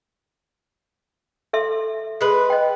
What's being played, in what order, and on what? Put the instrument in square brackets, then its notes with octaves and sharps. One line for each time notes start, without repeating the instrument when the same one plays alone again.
[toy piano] A4 E5 C6
[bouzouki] G#3 B4
[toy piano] D#5 G5